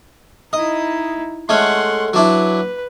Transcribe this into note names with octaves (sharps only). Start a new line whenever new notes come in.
D#4 E4 D#5
G#3 A3 C#4 F#5 C6
F#3 D4 E4 B4